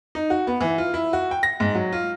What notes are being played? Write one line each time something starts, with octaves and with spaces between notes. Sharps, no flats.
D#4
F#4
B3
E3
F4
E4
F#4
G5
A#6
G#2
F#3
F4